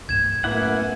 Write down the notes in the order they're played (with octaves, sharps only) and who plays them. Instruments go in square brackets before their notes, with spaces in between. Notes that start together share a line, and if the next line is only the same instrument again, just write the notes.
[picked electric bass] C2 G2 [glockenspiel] G#6 E7
[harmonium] F#2 B3 G#5 [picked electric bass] A2 [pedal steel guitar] A#3 E4 F#5